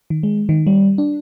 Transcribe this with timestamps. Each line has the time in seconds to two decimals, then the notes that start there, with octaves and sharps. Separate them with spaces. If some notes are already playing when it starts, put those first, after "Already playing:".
0.10 D#3
0.23 G#3
0.49 D#3
0.67 G3
0.98 D4